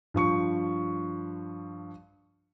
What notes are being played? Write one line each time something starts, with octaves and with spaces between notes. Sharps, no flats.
G2 F3 C#6 C#7